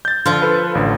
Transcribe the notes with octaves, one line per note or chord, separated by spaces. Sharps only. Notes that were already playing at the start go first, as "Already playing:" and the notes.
G6 A6
D3 F3 F4
A4 B4
A1 D3